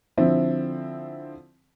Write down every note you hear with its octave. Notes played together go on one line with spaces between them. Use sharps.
D3 F3 C4 E4